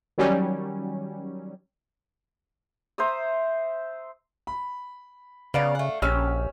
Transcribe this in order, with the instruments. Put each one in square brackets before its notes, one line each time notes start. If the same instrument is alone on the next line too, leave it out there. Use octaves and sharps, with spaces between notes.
[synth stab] D#3 F#3 G3 C#4
[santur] C5 E5 A#5 D#6
[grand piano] B5
[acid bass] C#3 [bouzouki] B3 D5 A#5 [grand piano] F5
[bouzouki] A3 F#5
[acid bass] A#1 [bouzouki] C#4 G4 [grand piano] E6 F6